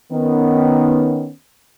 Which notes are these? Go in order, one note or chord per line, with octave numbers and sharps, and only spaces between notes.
D#3 B3 C#4